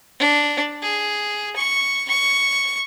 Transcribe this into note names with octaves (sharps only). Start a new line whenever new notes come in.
D4
G#4
C#6
C#6